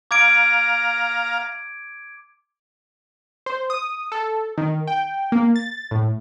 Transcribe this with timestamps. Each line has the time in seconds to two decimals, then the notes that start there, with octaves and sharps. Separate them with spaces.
0.11 F5 A#5 D6 G#6 D7
3.46 C5
3.70 D#6
4.12 A4
4.57 D#3
4.87 G5
5.32 A#3
5.56 A6
5.91 A2